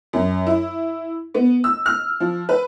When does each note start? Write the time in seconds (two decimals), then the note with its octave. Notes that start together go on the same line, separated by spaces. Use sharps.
0.13 F#2
0.47 E4
1.35 B3
1.64 E6
1.86 F6
2.20 F3
2.49 B4